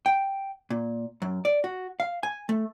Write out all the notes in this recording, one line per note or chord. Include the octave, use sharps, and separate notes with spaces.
G5
A#2
F#2
D5
F#4
F5
G#5
A3